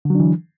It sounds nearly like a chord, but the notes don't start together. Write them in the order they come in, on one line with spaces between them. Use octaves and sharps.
D3 F#3 D4 E3